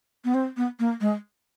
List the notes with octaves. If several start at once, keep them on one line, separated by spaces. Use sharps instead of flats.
B3
C4
B3
A#3
G#3